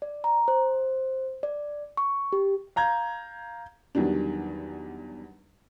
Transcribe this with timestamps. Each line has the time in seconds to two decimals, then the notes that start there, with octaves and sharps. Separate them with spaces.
0.02 D5
0.24 A#5
0.48 C5
1.43 D5
1.97 C#6
2.33 G4
2.76 F5 A#5 G6 G#6
3.95 E2 D#3 F#3 G3 D4